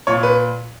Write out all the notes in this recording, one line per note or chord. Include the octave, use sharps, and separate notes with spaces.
A#2 C#5
B4